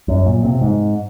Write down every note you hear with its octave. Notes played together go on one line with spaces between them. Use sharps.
F#2
A#2
C3
G#2